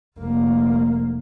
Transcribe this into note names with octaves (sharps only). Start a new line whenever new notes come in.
F1 A#3